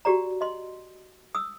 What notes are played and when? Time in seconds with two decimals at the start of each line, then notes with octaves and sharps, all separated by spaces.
0.05 F#4 G4 D5 A#5
0.41 D#5 C6
1.35 D#6 E6